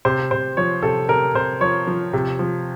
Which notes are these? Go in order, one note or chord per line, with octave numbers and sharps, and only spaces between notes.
C3 C5
C3 C5
F3 C#5
C3 A4
C3 A#4
C3 C5
F3 C#5
F3
C3
F3